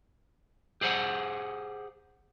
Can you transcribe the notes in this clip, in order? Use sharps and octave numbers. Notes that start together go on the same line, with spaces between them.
G4 G#4 C5 F#5